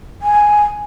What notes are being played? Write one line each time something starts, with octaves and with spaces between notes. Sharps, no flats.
G#5